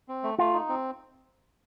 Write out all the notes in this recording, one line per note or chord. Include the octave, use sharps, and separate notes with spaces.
C4
A3
A3 F4
D#4
C4